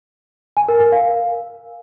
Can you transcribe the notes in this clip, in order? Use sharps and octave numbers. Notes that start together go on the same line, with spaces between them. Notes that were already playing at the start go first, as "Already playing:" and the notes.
G#5
A#4
A#4
F5